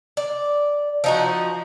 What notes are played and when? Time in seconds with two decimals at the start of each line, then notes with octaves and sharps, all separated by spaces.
0.17 D5
1.04 F3 D#4 F#4